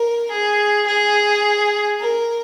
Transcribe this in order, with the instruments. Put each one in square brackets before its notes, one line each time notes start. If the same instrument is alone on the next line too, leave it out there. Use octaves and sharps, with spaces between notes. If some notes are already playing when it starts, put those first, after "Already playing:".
Already playing: [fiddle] A#4
G#4
G#4
A#4